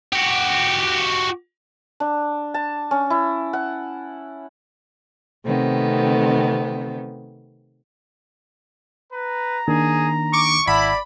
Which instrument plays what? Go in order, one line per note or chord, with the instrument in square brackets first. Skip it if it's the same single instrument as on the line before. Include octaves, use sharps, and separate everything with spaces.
[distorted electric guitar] F#4 G4
[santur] D4
A5
C#4
E4
F#5
[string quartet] C3 D#3 A3 B3 C4
[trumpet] B4 [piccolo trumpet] A#5
[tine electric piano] D#3 A#3 D4 [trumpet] G#4
[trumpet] C#6 [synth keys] D6
[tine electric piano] G#1 F#5 A5 [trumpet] E4 [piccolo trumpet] D5 [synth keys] B5